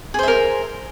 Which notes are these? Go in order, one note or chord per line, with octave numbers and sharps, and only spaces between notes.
G#4 A#4 C5 E5